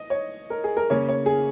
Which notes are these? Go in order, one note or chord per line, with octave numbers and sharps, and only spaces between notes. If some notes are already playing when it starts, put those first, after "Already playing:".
Already playing: D#5
C#5
A#4
G#4
A#4
C#3 A#3 C#4 C#5
C#5
G#4